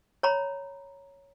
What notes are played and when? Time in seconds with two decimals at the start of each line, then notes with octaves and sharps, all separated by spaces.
0.23 C#5 A#5 B5